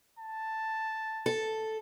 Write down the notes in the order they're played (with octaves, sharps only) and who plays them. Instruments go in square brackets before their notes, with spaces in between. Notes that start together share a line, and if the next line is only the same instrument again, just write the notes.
[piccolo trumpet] A5
[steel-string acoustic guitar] A4